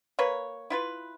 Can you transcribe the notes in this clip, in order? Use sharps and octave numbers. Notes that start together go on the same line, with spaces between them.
A#3 B4 C#5
E4 F4 B4